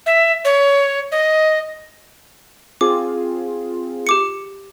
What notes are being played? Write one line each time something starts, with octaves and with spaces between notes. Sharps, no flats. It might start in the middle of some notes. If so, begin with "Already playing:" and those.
E5
C#5
D#5
C4 F4 G#4 D6
G4 D6 C#7